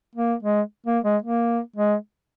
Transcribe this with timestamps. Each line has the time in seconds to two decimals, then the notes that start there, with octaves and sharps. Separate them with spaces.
0.15 A#3
0.43 G#3
0.86 A#3
1.04 G#3
1.22 A#3
1.76 G#3